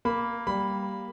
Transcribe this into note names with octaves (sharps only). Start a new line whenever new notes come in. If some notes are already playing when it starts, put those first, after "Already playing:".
A#3 B5
G3 B5